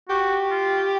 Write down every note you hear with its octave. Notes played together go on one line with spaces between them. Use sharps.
F#4 G4
F4